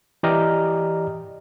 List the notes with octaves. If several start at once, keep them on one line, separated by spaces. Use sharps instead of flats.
E3 G4 D5 D#5 A#5 F6